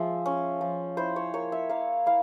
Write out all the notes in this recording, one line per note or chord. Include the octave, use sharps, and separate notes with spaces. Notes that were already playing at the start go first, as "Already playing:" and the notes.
Already playing: F3 G#3 E5
C#4
F3
E4 C5
C#5
A#3 C#5
E5
A#3 F5
E4 F5